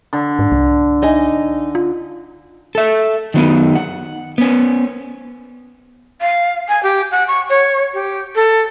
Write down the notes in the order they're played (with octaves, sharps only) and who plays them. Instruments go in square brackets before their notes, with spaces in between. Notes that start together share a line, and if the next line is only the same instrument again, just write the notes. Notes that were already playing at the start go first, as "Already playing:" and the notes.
[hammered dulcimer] D3
[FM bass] G#2
C2
[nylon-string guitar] D#4 D#5 G#5
[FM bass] F4
[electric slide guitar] A4 E5
D#3 F#3 B3 D#4
F#5
B3 C#4
[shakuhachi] F5
G#5
G4
F#5
C#6
C#5
G4
A4